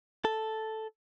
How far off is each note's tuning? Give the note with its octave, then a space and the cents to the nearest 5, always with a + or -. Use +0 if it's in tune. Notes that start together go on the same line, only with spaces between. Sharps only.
A4 +0